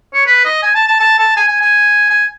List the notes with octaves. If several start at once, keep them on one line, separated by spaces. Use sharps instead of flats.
C#5
B4
D#5
G#5
A5
A5
A5
A5
G#5
G#5
G#5
G#5